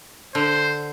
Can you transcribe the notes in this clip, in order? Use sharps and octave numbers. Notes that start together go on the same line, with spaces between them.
D3 C5